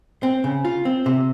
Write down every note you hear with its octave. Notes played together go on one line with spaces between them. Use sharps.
C4
C#3
F4
C4
C3